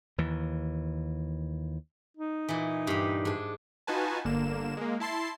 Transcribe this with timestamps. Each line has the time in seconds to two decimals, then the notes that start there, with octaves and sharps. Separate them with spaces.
0.18 D#2 E3
2.17 D#4
2.49 A#2 E3
2.87 G2 G4
3.25 G#2 D4
3.87 D#4 F4 F#4 B4 G#5 A5
4.25 G1 D3 A#3 E7
4.77 G#3 A#3
5.00 E4 A5 C6 C7